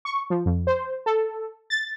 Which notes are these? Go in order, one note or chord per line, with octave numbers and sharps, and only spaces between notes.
C#6
F3
F2
C5
A4
A6